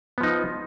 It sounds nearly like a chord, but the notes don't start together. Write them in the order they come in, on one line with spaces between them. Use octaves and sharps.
B3 F3 D#4